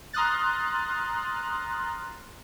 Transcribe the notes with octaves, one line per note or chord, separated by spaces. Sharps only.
A#5 C6 D#6 F6 F#6 A6